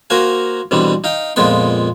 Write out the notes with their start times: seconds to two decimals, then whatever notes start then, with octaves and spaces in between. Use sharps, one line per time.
0.10 A#3 F#4 A#4 C5 F5 G#5
0.71 B2 D3 E3 G3 C4
1.04 D#4 F5 G5
1.36 F2 A#2 G#3 B3 G5 C6